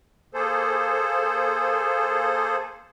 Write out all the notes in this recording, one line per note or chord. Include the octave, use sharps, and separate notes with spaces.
A#3 G#4 A4 C5